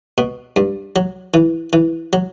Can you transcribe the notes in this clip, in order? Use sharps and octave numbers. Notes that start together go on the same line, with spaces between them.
B2
G2
F#3
E3
E3
F#3